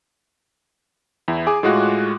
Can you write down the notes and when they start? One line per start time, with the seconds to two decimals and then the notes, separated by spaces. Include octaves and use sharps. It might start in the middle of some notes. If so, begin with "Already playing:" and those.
1.28 E2 E4
1.47 G#4 G#5 D6
1.63 A2 G#3 F4 F#4 F#6